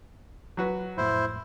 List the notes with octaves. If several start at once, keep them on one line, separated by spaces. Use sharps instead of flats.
F#3 F#4 B4
F2 A2 E4 C5